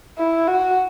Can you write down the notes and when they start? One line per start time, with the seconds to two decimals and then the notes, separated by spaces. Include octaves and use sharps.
0.18 E4
0.48 F#4